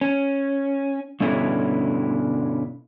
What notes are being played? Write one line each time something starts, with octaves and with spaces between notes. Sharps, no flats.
C#4
G2 B2 D3 C#4 E4